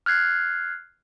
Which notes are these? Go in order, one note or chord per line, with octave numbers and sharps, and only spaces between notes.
F6 F#6 G#6 C7